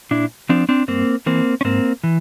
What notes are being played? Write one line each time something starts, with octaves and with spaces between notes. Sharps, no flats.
A#2 D4 E4
F3 C4 D4
C4 D4
G2 A#3 C4
E3 A#3 C4
C#4
G#2 A#3 C4
E3